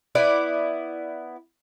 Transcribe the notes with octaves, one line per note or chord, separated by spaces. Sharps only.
B3 E4 D5